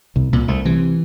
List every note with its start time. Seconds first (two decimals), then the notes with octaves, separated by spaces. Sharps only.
0.16 C2 C3
0.33 C2 A#2
0.48 C2 A3
0.65 C3 E3